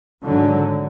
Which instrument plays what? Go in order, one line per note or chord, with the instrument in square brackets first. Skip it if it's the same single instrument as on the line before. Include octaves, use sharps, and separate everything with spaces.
[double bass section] G#1 G#2 D3 F#3